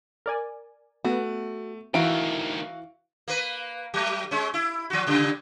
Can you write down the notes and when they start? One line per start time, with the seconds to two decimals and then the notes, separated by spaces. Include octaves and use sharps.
0.26 A#4 D5 G#5
1.05 A3 B3 F#4
1.94 D2 D#3 E3 E4 F#4 F5 A#5 D7
3.28 A#3 B4
3.94 F#3 A3
4.31 G#3 C#4
4.54 E4
4.90 F3 F#4
5.07 A#2 C#3 G3